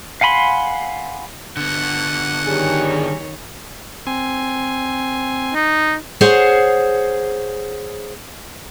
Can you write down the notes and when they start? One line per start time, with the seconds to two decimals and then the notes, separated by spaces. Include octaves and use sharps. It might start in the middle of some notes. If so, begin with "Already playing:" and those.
0.21 F5 F#5 G#5 B5 C6
1.57 D3 B3 F#5
2.46 D#3 G3 G#4 C#5
4.07 C4 G#5
5.54 D#4
6.21 G#4 C5 C#5 F#5